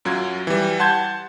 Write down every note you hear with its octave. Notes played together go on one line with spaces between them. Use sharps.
F#2 F#3 F4 G#6
E3 G3
F#5 A5 C6 G6 G#6